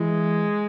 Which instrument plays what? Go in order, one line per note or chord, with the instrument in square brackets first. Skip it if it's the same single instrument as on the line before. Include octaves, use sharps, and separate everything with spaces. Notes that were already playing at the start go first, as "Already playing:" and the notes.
Already playing: [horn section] E3 [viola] G#3